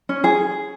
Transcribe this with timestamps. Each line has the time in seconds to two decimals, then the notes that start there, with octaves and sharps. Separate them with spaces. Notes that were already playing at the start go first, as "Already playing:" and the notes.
0.09 C#4
0.24 G#4